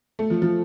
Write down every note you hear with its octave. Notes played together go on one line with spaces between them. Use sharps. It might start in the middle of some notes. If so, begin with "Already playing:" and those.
A3
F3
F3